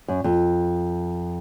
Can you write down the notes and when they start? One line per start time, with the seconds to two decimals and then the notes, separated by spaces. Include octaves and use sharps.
0.08 F#2
0.24 F2